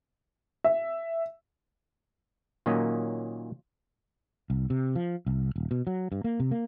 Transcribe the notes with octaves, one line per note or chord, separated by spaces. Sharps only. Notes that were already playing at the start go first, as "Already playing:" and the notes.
E5
A#2 D#3 F#3 A#3 C#4 D#5
C2
C3
F3
C2
D#1
B2
F#3
G2
A#3
C3
A#3